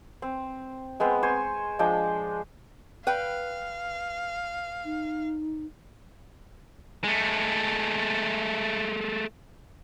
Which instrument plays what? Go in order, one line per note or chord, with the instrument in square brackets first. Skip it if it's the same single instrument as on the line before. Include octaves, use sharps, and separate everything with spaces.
[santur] C4
G#3 B3 C4
C5 G#5 C#6
F3 G#3 D4 G5
[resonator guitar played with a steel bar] B4 G5 [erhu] F5
[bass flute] D#4
[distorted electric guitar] G#3 A3